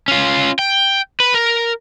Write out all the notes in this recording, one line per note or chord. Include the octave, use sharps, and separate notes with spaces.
C#4 F4
G5
B4
A#4